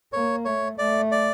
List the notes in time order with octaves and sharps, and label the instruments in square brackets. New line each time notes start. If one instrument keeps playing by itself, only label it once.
[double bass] A#3 [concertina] C#5
[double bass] A3 [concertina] C#5
[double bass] A3 [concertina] D5
[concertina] D5